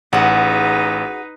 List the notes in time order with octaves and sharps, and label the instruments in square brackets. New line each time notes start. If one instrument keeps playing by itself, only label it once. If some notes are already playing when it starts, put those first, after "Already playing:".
[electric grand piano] A1 F#5 [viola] D#4 B4 [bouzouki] F#4 G#4